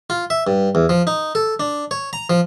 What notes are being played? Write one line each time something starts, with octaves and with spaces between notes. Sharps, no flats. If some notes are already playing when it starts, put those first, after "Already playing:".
F4
E5
G2
E2
F3
D#4
A4
D4
C#5
A#5
F3